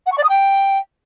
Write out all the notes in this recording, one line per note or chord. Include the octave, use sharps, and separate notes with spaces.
F#5
C#6
D5
D#6
G5